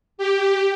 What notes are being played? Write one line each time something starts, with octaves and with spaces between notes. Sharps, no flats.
G4